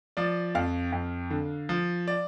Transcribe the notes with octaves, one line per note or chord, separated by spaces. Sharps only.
F3 D5
F2 F5
F2
D3
F3
D5